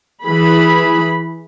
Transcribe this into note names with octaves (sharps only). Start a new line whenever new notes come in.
E3 G#4 B5